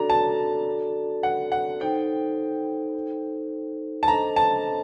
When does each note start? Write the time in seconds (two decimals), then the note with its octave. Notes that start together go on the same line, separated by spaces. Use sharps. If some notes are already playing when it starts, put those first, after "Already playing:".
Already playing: D4 F#4 A4 D5 A#5
0.10 A5
1.23 F#5
1.52 F#5
1.80 D#4 A4 C5 G5
4.03 A5
4.08 D4 A4 C5 D#5 A#5
4.36 A5